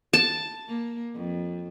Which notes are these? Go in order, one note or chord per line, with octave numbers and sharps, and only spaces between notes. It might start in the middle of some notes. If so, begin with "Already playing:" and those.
A5
A#3
F2